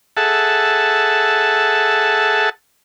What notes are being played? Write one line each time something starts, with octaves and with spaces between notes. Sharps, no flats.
G#4 A4 E5 F#5 A5